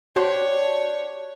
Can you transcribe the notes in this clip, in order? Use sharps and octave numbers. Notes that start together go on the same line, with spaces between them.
D4 F#4 G4 C5 C#5